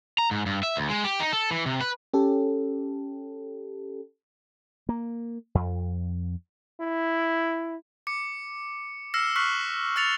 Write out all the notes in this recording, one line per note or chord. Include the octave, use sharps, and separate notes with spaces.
A#5
G#2
G2
E5
D2
G#3
G4
D#4
A4
E3
C3
B4
C#4 G4 A4
A#3
F2
E4
D6 C#7
E6 F6 A#6 C7 C#7 E7
C#6 F6 F#6 B6 C7 F#7
E6 F6 A6 C#7 F7